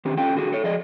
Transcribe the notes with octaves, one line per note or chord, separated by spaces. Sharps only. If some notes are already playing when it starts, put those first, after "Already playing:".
D#3 C4 D4 G4
C#4 F4 A4 G5
D3 F#4 G#4
A4 C#5
F3 G#4 D5 D#5